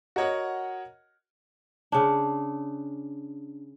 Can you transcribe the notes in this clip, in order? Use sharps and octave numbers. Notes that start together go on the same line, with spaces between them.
F#4 A#4 C#5 D#5 F#5
C#3 D4